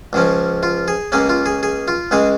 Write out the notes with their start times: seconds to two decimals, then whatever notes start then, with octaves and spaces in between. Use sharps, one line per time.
0.13 C#2 C#3 F3 C#4
0.63 F4
0.88 G#4
1.12 C#2 C#3 A#3 C#4 G#4
1.29 F4
1.46 G#4
1.63 G#4
1.88 F4
2.11 C#2 C#3 G#3 G#4